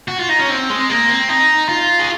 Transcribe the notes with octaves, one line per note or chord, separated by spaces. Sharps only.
F#4
F4
D#4
C#4
C4
G#3
A#3
C4
D#4
F4
G#4